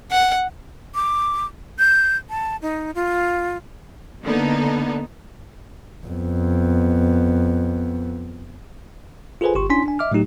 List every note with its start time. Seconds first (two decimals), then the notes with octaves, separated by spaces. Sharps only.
0.11 F#5
0.95 D6
1.79 G6
2.29 A5
2.62 D#4
2.95 F4
4.23 D3 A#3 B3 D#4 A4
6.07 F2 B3
9.41 F4 G#4 A4 B4 C5 G#5
9.55 G1 G4 C6 C#6
9.70 C#4 D4 E4 G#5 C6 B6
9.86 D4 G#5
9.99 D#5 E5 D6 F6
10.11 A2 F#3 A3 D#4 G4